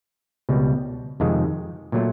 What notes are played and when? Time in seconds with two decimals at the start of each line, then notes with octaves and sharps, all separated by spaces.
0.49 C#2 B2 G3
1.20 F2 C3 D#3 G#3
1.92 A#2 F#3 A3